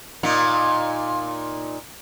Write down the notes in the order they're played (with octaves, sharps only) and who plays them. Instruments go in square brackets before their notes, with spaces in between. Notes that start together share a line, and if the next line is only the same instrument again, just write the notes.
[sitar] A#2 D#4